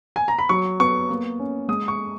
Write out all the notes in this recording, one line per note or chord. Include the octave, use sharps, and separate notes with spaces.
G#5
A#5
B5
F#3 C#6
B3 C#6
A#3
C#4
G#3 D#6
C#6